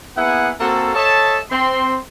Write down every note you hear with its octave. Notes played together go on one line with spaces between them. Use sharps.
A#3 B3 E4 G#4 F#5 G#5
A#3 C4 F#4 A4
A4 C#5 D#5 E5 A5
C4 C6